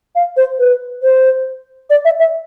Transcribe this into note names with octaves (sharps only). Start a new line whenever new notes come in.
F5
C5
B4
C5
D5
E5
E5